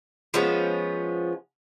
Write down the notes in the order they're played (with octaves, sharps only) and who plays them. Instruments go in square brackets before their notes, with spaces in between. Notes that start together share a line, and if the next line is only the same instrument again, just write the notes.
[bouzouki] F3 G#3 B3 C#4